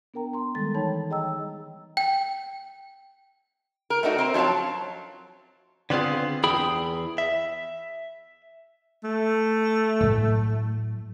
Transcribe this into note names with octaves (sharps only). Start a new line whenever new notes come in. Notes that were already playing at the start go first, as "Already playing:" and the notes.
B3 D4 A#4 G5 A#5
A#5 C6
D#3 G3 G#3 A4 A6
E3 D#4 C#5 G5 A5 B5
G#4 D#5 G5 A#5 E6
G5
A#4
A3 D4 D#4 F#4
C4 A#4 C5
F3 F#3 C#5 F5 A5
D3 B3 C4 F4 G#4
E2 E4 G#4 G5 B5
E5
A3
A2 F#3